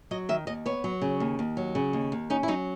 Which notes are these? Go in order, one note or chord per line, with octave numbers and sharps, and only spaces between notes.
F#3 D#5
D#3 E5
D#2 D#5
B3 C#5
F#3
C#3
D#2
D#2
F#3
C#3
D#2
D#2
C#4 D#4
E4
F#3 D#4